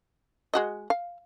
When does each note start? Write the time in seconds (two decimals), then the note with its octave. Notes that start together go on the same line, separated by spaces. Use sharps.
0.54 G#3 F#4 D#5
0.90 F5